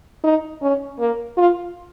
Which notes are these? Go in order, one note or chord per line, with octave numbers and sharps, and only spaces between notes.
D#4
C#4
A#3
F4